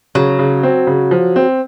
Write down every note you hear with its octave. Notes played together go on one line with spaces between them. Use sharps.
C#3 F#3
C#3
C4
C#3
F3
C4